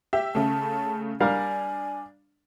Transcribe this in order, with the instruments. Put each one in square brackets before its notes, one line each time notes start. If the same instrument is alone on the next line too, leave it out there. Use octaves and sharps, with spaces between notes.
[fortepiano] G4 [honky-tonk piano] E5
[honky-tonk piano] C#3 A3 [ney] A5
[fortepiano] G3 A#4 F5 [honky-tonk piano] D4 [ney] G#5